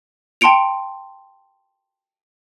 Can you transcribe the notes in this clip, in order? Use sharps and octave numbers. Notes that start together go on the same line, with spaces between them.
G5 A5 C6 C#7 D7 F7